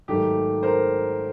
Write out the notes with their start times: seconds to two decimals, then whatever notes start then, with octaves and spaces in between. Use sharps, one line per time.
0.08 G#2 D#3 F#3 A3 G4
0.63 A#4 C5